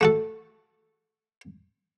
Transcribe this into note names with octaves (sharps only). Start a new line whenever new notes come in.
A3 F#4 A4